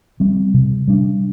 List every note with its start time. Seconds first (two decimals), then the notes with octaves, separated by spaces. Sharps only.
0.20 G3 C4
0.54 C3
0.88 G3 D4